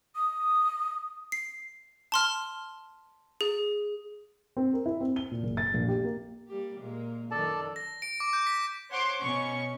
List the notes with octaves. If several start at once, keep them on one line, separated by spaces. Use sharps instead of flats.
D#6
C7
A5 C6 F6
G#4
C4
A#4
E4
C4
G7
A#2
F#1
A6
A#1
G4
A#3
G3 A#3 G4
A#2 G#3 A#3
F#2 D#3 F#3 A4 D5 A5
A#6
D7
D6
G6
B6
C5 C#5 F#5 C6 D6
B2 C#4 C#6